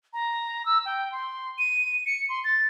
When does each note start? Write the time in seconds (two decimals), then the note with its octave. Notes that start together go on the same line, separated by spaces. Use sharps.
0.13 A#5
0.66 E6
0.85 G5
1.12 C6
1.58 D#7
2.06 C#7
2.29 C6
2.44 A6